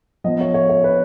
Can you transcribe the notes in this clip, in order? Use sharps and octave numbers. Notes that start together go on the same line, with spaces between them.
F3 B3 D#5
C#5
C#5
C#5
B4